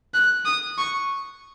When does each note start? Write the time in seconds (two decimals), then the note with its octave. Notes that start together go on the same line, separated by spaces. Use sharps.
0.14 F#6
0.45 D#6
0.78 C#6